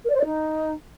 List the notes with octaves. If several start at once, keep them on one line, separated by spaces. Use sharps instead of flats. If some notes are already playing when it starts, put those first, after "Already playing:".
A#4
D5
C5
D5
D#4